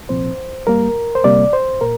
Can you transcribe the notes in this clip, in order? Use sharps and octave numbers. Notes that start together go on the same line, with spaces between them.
C2 A#2 F3 C4 C5
G2 G3 A#3 A#4
C5
D2 C3 G3 A#3 D5
C5
A#2 A#4